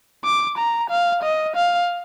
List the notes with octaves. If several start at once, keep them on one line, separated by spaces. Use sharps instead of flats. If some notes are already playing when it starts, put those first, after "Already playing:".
D6
A#5
F5
D#5
F5